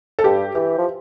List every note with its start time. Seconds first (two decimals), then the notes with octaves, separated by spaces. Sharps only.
0.19 A4
0.24 G2 G4
0.55 E3 G4
0.78 F3